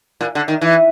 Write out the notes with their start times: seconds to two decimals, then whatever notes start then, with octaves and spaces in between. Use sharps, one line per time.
0.21 A#2
0.35 D3
0.48 D#3
0.61 E3